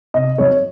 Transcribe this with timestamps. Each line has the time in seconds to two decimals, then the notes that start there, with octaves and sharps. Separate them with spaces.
0.14 C3 D#5
0.38 F#3 C4 C#5